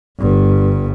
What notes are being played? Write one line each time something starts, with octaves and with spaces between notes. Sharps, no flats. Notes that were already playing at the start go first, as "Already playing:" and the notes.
G1 G2